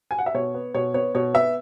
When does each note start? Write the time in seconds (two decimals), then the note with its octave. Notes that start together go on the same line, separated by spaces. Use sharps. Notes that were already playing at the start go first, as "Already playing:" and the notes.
0.11 G#5
0.19 F#5
0.26 E5
0.34 B2 C#5
0.54 B3
0.74 B2 C#5
0.94 B3 C#5
1.15 B2 C#5
1.34 B3 E5